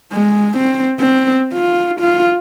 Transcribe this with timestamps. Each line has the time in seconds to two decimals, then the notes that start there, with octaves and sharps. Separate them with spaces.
0.13 G#3
0.58 C4
1.00 C4
1.53 F4
2.01 F4